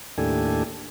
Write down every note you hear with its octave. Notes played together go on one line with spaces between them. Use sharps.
D#2 A2 D4 G4 A4 G#5